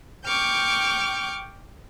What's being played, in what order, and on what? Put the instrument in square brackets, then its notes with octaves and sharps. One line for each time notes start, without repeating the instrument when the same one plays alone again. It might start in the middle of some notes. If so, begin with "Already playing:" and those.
[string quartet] G5 C#6 D6 F6 G6